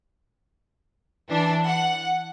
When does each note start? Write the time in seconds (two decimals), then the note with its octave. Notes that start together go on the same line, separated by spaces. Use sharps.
1.29 E3 D4
1.66 F#5